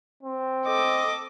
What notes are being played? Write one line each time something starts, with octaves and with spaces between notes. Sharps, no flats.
C4
A4 D#5 D6